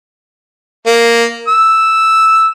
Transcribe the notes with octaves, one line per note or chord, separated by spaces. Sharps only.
A#3
E6